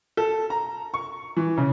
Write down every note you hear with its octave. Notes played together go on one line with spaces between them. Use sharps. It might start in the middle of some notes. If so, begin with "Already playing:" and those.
A4
A#5
C#6
E3
C#3